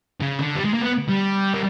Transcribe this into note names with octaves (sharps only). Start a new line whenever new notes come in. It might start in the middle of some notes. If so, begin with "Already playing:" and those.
C#3
D3
G3
G#3
A#3
B3
G3
A#3